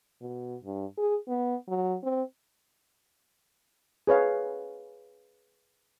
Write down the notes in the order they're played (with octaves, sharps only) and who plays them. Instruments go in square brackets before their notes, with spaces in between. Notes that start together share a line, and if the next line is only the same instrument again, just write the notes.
[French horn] B2
G2
G#4
B3
F#3
C4
[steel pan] G#4 B4 C#5 F5